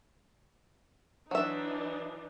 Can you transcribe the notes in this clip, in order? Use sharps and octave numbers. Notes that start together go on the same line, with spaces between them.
E3 F#3 D4 D#4 E5